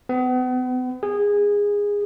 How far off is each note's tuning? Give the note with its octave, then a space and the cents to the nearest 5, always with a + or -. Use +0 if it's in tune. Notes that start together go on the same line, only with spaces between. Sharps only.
B3 +40
G#4 -20